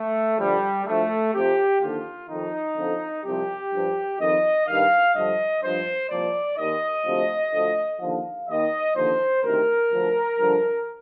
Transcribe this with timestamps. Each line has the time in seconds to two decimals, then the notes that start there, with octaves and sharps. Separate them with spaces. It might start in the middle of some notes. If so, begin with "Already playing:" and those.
Already playing: A3
0.38 G2 D3 F3 G3
0.86 D2 D3 F3 A3
1.34 F2 C3 F3 G4
1.81 D#2 D3 F3 F4
2.29 F2 D#3 D#4
2.77 F2 D3 F3
3.24 C2 C3 F3 G4
3.72 G2 F3
4.19 F2 D#3 D#5
4.67 G2 D#3 F5
5.15 G2 D3 F3 D#5
5.62 G2 F3 C5
6.10 C2 A#2 F3 D5
6.57 D#2 D#3 D#5
7.05 D2 C3 F3
7.53 D2 D3 F3
8.00 D#2 D3 F3 F5
8.47 D#2 D#3 D#5
8.95 D#2 D3 F3 C5
9.43 D2 C3 D#3 A#4
9.90 D2 D3 F3
10.39 G2 D3 F3